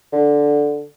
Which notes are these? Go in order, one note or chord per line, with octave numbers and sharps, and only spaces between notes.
D3